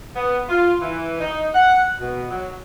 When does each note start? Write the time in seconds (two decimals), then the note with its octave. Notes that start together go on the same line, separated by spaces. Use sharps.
0.15 B3
0.49 F4
0.81 E3
1.21 D#4
1.54 F#5
2.00 B2
2.30 F#3